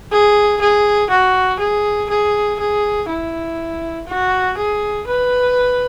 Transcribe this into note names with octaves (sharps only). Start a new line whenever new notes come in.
G#4
G#4
F#4
G#4
G#4
G#4
E4
F#4
G#4
B4